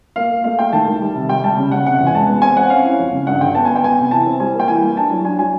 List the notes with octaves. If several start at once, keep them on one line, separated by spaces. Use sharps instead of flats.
A#3 F5
A#3
A3 F5
A3 G5
D#3 A5
D#3
G3
C3
G3 G5
G3 A5
C#3
C#3 F#5
C3 F#5
E2
G#5
G#3 A5
B3
C4 G#5
C4 F#5
C#4 F5
E4
F2
C#3
G2 F#5
D3 G5
B3 A5
B3 G#5
G5
B3 G#5
C3
E3 A5
C4
G3 G#5
A#3 G5
E3 G#5
G3
D4 A5
F#3
D4 G#5
F#3 G#5